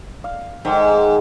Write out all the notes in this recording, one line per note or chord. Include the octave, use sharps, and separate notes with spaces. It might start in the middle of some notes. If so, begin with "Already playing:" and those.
F5
G#2 D#3 G#3